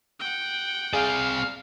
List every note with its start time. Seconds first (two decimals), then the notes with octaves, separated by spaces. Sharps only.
0.20 F#5 G5
0.93 C4 G#4 D5 F5